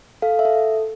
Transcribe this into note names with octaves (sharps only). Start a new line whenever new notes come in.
A4 F5
E5
A4